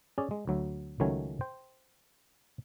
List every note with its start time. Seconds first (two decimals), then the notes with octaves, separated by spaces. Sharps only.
0.18 C#4 G#4 D5
0.31 G#3
0.47 D2 F#3 E5
1.00 C#2 D#3 F#3 A3 C#4 G#5
1.41 C5 G5